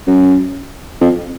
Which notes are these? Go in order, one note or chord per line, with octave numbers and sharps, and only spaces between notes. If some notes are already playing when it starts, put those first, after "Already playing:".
F#2
F2